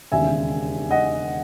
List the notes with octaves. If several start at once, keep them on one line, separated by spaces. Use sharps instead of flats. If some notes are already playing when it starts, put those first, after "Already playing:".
E1 D#2 C#3 E5 G#5
D#5 F#5